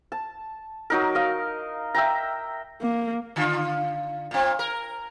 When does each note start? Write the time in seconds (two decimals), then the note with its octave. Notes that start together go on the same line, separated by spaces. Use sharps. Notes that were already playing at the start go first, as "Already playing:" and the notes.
0.12 A5
0.90 F#3 D#4 A#4
1.15 D#5 F5
1.94 E5 G5 A#5
2.82 A#3
3.36 D3 F4
4.31 A#2 C4
4.59 A#4